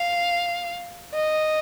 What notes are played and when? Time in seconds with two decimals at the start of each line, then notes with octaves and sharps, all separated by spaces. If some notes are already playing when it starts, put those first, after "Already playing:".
Already playing: F5
1.14 D#5